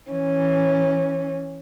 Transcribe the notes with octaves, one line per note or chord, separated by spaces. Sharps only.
E3 C#4